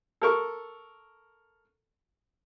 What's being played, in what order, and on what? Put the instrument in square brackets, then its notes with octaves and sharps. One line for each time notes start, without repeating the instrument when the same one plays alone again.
[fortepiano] A4 A#4 C#6